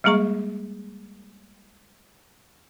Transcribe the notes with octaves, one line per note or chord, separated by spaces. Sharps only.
G3 G#3 A#3 G#4 A#5 C#6